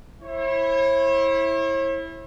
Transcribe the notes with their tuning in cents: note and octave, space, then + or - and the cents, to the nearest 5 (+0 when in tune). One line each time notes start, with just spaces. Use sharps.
E4 +0 C#5 -45